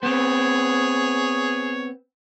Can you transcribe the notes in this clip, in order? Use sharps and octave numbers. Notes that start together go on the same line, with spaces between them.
B3 C4 G#4 C#5